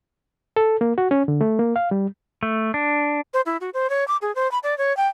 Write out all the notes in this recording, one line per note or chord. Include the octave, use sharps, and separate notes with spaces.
A4
A#3
F#4
C#4
D3
A3
A#3
F5
G3
A3
D4
C5
E4
F#4
C5
C#5
D6
G#4
C5
B5
D5
C#5
G5